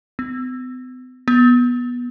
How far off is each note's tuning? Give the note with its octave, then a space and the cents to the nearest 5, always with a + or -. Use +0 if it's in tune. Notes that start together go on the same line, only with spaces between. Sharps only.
B3 +45
B3 -15